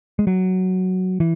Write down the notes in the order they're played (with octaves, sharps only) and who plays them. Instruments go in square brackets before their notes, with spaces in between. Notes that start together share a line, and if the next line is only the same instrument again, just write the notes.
[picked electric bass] G#3
F#3
E3